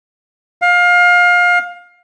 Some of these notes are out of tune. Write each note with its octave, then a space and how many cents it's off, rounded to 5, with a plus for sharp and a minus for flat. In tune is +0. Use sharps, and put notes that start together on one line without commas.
F5 +25